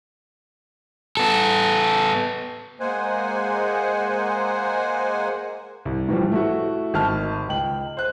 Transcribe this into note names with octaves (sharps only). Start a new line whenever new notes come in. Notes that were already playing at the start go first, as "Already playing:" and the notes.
B3 A4
G#3 A#3 C5 F#5 G#5
C2
A2 E3 F3 G3
A3 E4 F#4
G#1 A5 F6
C#2 G5 F#7
C5 F#6